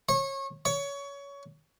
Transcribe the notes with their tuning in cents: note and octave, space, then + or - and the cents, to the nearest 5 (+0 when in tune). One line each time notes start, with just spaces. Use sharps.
C#5 -30
C#5 +20